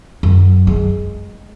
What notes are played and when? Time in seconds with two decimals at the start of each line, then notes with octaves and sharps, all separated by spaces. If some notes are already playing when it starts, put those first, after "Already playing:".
0.23 F#2
0.67 G#3